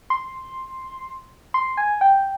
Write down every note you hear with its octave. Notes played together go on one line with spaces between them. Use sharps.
C6
C6
G#5
G5